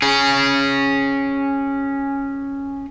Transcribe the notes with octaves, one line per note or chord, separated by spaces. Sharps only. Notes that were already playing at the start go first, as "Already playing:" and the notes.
C#4 G#4